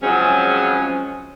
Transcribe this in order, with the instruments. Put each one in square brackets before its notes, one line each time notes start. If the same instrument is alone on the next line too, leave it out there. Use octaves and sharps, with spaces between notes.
[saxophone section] C#3 F3 F#3 G#3 C4 C#4